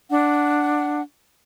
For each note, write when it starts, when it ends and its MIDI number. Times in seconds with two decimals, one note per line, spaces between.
0.10 1.00 62
0.10 1.00 78